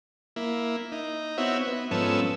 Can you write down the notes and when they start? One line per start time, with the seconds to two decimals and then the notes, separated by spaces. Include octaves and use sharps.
0.36 A#3 E4
0.92 D#4
1.38 B3 C4 E4 F#4 C#5 E5
1.67 B3
1.91 G#2 F3 B3 C#4 A4 E6